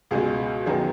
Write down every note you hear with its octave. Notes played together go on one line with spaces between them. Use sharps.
C#2 B2 G#3 G#4
F#2 D#3 F#3 B3 G#4